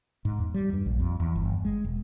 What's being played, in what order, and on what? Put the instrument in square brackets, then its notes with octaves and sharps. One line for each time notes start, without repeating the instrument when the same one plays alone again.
[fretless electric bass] G#2
E2
G3
G2
A#1
F2
E2
G1
G#3
E1